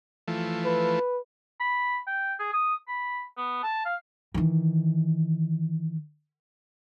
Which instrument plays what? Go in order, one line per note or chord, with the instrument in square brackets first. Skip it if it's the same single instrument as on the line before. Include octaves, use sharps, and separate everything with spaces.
[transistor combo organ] E3 F3 A3
[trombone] B4
[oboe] B5
G5
G#4
D#6
B5
B3
A5
F5
[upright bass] D#3 E3